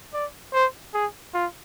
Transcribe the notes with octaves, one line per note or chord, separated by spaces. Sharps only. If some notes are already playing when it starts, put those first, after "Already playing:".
D5
C5
G#4
F4